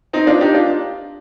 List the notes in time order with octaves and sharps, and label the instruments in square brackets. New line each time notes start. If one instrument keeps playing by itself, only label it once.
[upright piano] C4 D#4
D4 F4
D#4 G4
D4 F4